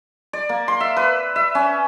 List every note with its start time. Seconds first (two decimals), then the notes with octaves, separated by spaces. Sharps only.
0.33 D5
0.49 A#3
0.68 C6
0.80 E5
0.97 B4
1.36 E5
1.55 C#4